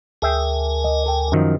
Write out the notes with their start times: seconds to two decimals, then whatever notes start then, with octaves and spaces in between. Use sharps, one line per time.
0.22 D2 G#4 A#4 E5 G5 G#5
0.84 D#5
1.06 A4 G5
1.32 F#2 D#3 F3